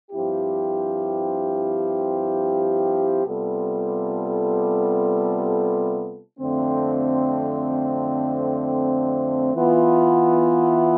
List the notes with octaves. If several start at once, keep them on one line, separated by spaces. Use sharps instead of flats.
G2 F3 C4 E4 G4
C3 G3 B3 F4 A4
F2 D3 A3 C4
E3 B3 F4